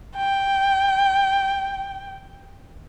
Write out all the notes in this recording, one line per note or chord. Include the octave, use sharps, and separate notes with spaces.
G5